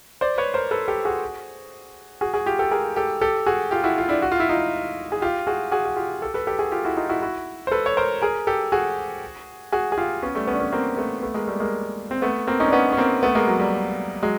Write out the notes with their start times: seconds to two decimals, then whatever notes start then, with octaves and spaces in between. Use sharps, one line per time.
0.21 C5 D5
0.38 B4 C#5
0.54 A#4 C5
0.71 A4 B4
0.88 G4 A4
1.05 F#4 G#4
2.21 F#4 G#4
2.34 F#4 G#4
2.46 F4 G4
2.59 G4 A4
2.71 G#4 A#4
2.96 G4 A4
3.21 G4 A4
3.46 F#4 G#4
3.71 F4 G4
3.84 E4 F#4
3.98 F4
4.09 D4 E4
4.22 F#4
4.32 F4
4.40 E4
4.49 D#4 F4
5.12 G#4
5.22 F4 G4
5.47 F#4 G#4
5.71 F#4 G#4
5.85 F#4
5.96 F4 G4
6.22 G4 A4
6.34 A4 B4
6.47 G4 A4
6.59 F#4 G#4
6.72 F4 G4
6.85 E4 F#4
6.97 D#4 F4
7.09 E4 F#4
7.22 E4 F#4
7.67 C5
7.71 A4 B4
7.86 C#5
7.97 A#4 C5
8.22 G#4 A#4
8.47 G4 A4
8.72 F#4 G#4
9.72 F#4 G#4
9.92 G#4
9.98 F4 G4
10.23 B3 C#4
10.35 G3 A3
10.47 B3 C#4
10.54 D4
10.60 B3 C#4
10.72 A#3 C4
10.97 A3 B3
11.22 A3 B3
11.34 G#3 A#3
11.47 G3 A3
11.60 G#3 A#3
12.11 C4
12.22 A3 B3
12.47 A#3 C4
12.60 C#4 D#4
12.68 D4
12.73 B3 C#4
12.92 C#4
12.97 A#3 C4
13.23 A3 B3
13.35 G#3 A#3
13.48 F#3
13.60 G3
14.23 F#3 G#3